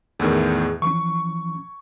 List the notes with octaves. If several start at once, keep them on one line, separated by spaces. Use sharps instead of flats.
E2 A2 D#3 G#4 E6 F#6
E3 F3 C#4 C#6